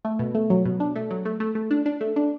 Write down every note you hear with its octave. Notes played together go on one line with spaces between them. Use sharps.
A3
B2
A3
F#3
B2
D4
A3
F#3
A3
A3
A3
D4
D4
A3
D4